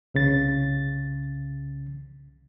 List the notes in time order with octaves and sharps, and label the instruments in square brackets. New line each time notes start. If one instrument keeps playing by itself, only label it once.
[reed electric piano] C2 C#3 A6